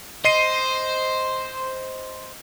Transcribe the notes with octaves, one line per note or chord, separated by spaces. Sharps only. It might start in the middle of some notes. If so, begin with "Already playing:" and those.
C5 D#5 C7 D#7